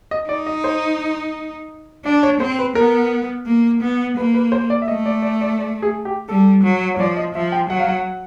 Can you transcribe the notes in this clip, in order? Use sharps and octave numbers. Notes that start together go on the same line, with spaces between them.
D#5
D#4 D5
D#5
C5
D4 D5
C#5
C4 C5
B4
B3 A#4
A#3
B3
A#3 B4
B4
C5
D5
E5
A3 D#5
D5
D5
D5
D5
G#4
G4
G3 A4
F#3
C#5
F3 D5
D#5
F3 E5
G5
F#3 F#5
F5
F#5